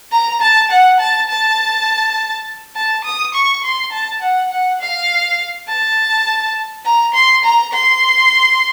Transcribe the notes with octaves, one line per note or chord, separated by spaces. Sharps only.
A#5
A5
F#5
A5
A5
A5
D#6
C#6
C6
A5
F#5
F#5
F5
A5
A#5
C6
A#5
C6